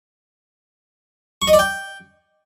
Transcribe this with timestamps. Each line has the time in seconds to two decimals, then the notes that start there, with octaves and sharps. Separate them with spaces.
1.42 C#6
1.47 D#5
1.53 D5
1.59 G5